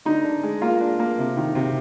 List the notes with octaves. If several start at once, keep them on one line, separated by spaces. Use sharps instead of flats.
D3 D#4
D4
G#3
A#3 F4
D4
A#3
C3
D#3
C3